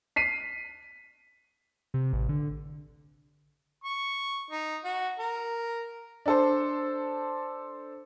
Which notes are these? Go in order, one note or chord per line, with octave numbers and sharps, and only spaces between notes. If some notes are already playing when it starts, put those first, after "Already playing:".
B6 C7 D#7
C3
A1
D3
C#6
D#4
F#4
A#4
D4 A4 C5